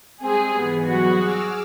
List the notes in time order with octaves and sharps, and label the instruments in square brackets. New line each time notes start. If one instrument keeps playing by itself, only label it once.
[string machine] G3 G#3 [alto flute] C4 [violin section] G#4
[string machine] G#2 E3 [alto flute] B3
[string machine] F#3 G3 G#4 [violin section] F#4
[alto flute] G#4 [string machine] D6 E6 F6